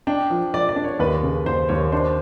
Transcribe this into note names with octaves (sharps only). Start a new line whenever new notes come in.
D4 G5
F3
F3 D5
D5
D4
C#5
D#2 B4
C#3
D#2 C5
D#2 C#5
D4 C5